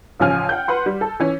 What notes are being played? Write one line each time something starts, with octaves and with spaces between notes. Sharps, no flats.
A1 C#3 F3 G#5 F6
F#5 G5 G6
B4 F#5 C6
G3
A4
E3 C#4